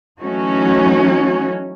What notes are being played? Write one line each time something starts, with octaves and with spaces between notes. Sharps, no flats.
E3 F#3 A3 C#4 D#4 F#4